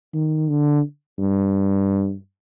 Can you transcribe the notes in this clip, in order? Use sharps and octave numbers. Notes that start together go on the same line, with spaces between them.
D#3
D3
G2